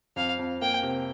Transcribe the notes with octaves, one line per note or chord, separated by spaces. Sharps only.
F2 F5
F2
A#3 G5
C3